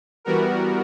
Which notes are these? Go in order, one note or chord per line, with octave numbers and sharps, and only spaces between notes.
E3 G3 B3 F#4 A#4